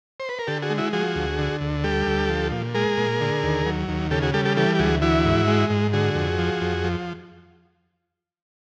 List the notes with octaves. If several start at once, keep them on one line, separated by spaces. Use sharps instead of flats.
C5
B4
A#4
D3 G4 A4
F#4 G#4
G#3
E4 F#4
F3 F#4 G#4
D2
D3
D2
G3 G4 A4
D2
F3
A#2
G#3 G#4 A#4
A#2
D3
D#2
F#3
D#2
C#3 G4 A4
F#4 G#4
G3 G4 A4
G4 A4
E3 G4 A4
G4
D2 F#4 G#4
E3 E4 F#4
G#2
G#3
G#2
D3 F#4 G#4
F2
F3
F2
F3